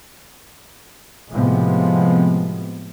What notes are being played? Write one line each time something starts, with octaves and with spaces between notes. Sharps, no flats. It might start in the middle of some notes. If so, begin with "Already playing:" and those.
A2 C3 F3 G#3 B3